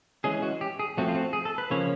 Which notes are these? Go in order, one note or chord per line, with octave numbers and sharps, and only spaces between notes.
E3 G#3 C#4 G#4
F#4
G4
G#4
F3 A3 C4 F#4
F4
F#4
G#4
A4
B4
C#3 F3 A#3 C#4 C#5